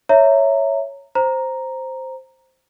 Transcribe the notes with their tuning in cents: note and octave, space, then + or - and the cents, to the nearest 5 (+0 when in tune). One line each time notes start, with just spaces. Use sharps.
C#5 +0 E5 +0 A#5 -15
C5 +0 A#5 +0